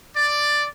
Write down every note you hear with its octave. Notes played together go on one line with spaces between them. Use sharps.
D5